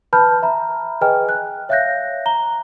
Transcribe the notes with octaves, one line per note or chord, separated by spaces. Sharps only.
B4 A5 B5 F6 G6
E5 A#5 B5
G#4 B4 D#5 G5 G#5 F6
F#6
C#5 E5 F5 F#6 G6 A#6
A#5 G7